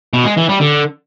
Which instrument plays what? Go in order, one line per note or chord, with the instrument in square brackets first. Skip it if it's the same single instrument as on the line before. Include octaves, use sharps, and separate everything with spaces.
[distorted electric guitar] B2
G#3
E3
G3
D3